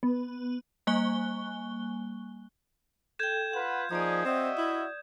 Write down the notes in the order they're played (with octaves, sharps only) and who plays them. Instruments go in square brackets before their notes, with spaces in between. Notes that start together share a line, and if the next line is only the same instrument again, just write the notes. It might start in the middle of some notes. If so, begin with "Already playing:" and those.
[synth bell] B3
G3 A#3 G#5 C#6 F#6 G7
[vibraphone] A4 G5 [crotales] G6 G#6 E7
[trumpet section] F4 B4 [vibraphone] F#5
[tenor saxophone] F3 [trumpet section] A#3 D#4 G#4 [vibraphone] D5 D#6
[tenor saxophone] C4 [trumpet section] F#4 D#5 E5
[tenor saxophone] E4